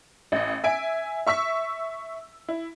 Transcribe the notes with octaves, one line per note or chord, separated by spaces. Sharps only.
A1 D#5
E5 G#5 D7
E5 C#6 E6 B6
E4